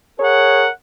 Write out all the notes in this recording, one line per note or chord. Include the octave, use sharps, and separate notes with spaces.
G#4 A#4 C#5 F#5